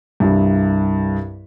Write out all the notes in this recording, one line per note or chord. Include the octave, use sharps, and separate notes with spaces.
C2 G2